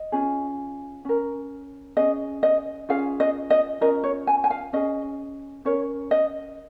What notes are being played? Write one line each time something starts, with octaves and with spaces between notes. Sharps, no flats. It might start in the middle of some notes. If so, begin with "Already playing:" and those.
Already playing: D#5
C#4 F4 G#4
C#4 A#4
C#4 G#4 D#5
D#5
C#4 F4 G#4 F5
D#5
D#5
C#4 F4 A#4 D#5
C#5
G#5
G#5
F5
C#4 G#4 D#5
C#4 A#4 C#5
D#5